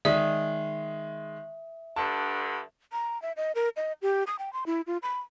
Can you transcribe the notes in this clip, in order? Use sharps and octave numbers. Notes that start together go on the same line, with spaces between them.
D#3 G#3 D5 E5 D#6
G2 D3 A5
A#5
E5
D#5
A#4
D#5
G4
D#6
G5
C6
E4
F4
B5